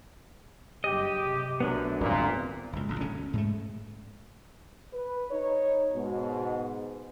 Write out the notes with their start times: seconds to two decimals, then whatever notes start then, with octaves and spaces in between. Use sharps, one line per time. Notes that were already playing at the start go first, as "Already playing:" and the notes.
0.84 F#1 G2 G4 D#5
1.22 C3
1.60 B1 F#2 A3 B3 D4
2.00 D#1 G#1 F#2 A#2 G3 C4
2.73 F#1 C#2
2.88 D1 C#2
3.01 G1 G#2 D3 C#4
3.14 D2
3.33 G#2 G#3 A3
4.93 B4
5.31 D#4 C#5
5.93 G#2 B2